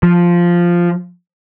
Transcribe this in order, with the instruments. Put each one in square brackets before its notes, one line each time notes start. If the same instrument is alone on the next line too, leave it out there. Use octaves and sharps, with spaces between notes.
[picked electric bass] F3